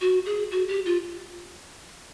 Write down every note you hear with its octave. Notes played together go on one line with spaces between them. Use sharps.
F#4
G#4
F#4
G4
F4